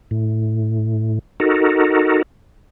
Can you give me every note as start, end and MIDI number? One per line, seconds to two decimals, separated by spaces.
0.11 1.19 45
1.40 2.22 63
1.40 2.22 66
1.40 2.22 69
1.40 2.22 70